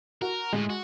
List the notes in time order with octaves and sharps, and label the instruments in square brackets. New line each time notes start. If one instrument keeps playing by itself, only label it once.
[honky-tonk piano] F#4 [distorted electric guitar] A#4
[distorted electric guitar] A2 [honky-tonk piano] G#3
[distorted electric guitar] F#4